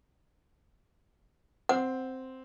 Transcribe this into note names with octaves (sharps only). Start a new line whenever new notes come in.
C4 F#5